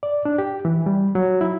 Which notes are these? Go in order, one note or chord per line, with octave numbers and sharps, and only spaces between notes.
D5
D4
G4
E3
G3
F#3
E4